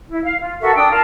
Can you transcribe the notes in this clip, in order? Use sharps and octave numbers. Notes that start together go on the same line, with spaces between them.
E4
F5
F4
F#4 A4 A#4 E5
D4 G5 D#6 E6
F4 A#4 A5